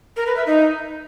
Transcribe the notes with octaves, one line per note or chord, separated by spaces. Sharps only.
A#4
B4
E5
D#4